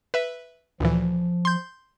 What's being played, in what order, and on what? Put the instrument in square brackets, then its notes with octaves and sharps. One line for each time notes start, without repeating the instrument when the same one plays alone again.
[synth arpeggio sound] B4 E5
[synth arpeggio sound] D2 A#2 E3 [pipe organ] F3
[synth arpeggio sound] C6 G6